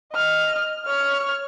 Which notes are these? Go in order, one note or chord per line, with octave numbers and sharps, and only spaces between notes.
D#5 F6
C#5 F6